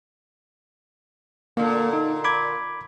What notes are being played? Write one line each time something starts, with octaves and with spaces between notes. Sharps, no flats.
A#2 D3 A#3
D#4
B5 D6 G#6